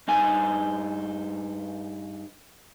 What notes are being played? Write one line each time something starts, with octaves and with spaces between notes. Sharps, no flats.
G2 D#4 G#5